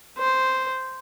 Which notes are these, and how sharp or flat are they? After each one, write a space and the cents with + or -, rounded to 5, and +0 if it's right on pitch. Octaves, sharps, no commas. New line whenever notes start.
C5 -5